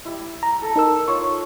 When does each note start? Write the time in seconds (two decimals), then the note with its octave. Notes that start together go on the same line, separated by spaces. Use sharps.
0.05 G3 E4
0.43 A#5
0.62 A4
0.76 D#4 A#4 E6
1.07 F4 C#5 C#6